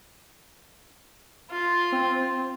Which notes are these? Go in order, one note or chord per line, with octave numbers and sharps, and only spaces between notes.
F4
C4